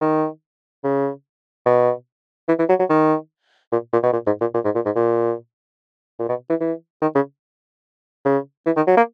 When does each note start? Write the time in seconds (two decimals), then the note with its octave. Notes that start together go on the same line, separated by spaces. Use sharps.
0.01 D#3
0.84 C#3
1.66 B2
2.48 E3
2.59 E3
2.69 F#3
2.79 F#3
2.89 D#3
3.72 A#2
3.93 A#2
4.03 B2
4.12 A#2
4.26 G#2
4.41 A#2
4.54 A#2
4.64 G#2
4.75 A#2
4.85 G#2
4.95 A#2
6.19 A#2
6.29 B2
6.50 E3
6.60 E3
7.02 D#3
7.15 C#3
8.25 C#3
8.66 E3
8.76 D#3
8.87 F#3
8.97 A#3